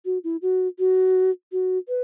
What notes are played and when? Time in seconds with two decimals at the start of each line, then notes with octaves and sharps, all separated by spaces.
0.05 F#4
0.24 E4
0.42 F#4
0.79 F#4
1.52 F#4
1.88 B4